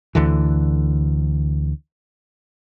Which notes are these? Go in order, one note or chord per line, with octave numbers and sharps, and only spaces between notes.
D2 D3 E3